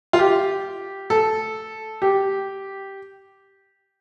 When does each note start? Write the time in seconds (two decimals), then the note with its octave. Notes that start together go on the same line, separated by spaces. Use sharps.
0.13 F4
0.19 G4
1.10 A4
2.02 G4